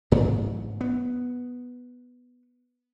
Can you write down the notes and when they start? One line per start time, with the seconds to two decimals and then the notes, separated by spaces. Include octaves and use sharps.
0.11 A1 G#2 C3 F#3
0.81 B3